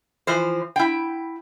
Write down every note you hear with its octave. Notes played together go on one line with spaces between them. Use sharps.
E3 F3 C5
E4 G5